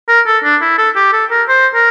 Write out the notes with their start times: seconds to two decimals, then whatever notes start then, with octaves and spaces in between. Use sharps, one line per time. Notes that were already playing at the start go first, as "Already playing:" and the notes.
0.08 A#4
0.26 A4
0.44 D4
0.61 E4
0.78 A4
0.96 G4
1.13 A4
1.30 A#4
1.48 C5
1.74 A#4